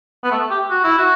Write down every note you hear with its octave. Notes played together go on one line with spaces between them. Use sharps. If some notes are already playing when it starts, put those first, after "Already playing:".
B3
A3
G4
F#4
E4
F#4